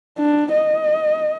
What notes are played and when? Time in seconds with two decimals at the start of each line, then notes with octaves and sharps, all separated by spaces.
0.18 D4
0.52 D#5